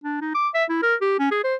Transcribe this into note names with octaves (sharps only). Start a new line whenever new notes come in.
D4
D#4
D6
E5
E4
A#4
G4
C#4
G#4
C5